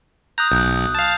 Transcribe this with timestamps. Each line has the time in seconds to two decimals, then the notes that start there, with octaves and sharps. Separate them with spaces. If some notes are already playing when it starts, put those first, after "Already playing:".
0.38 A#5 D#6 F#6 G6
0.52 B1 F#6 G6
0.95 F5 A5